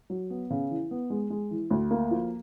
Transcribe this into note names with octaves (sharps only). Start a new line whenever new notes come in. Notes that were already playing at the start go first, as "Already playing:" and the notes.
F#3
B3
C#3
E3
B3
G#3
G#3
E3
D2
A#3
F3